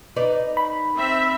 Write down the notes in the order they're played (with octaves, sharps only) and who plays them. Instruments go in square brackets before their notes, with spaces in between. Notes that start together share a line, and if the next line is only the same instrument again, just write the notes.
[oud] D#4 B4 D5
[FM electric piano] B5
[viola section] C4 E5